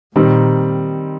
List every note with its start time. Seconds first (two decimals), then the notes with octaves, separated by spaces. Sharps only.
0.15 A#2 D#3 G3 C4 D#4